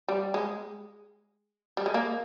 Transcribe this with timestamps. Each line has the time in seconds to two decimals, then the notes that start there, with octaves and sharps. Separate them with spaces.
0.08 G3
0.34 G#3
1.77 G3
1.86 G#3
1.94 A#3